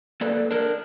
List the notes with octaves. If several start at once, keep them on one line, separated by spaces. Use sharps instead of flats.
A#3 A4 B4 D5
D4 A#4